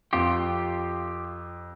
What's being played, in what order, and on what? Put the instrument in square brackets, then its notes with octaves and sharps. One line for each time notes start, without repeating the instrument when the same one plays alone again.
[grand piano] F2 [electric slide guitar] F4 G4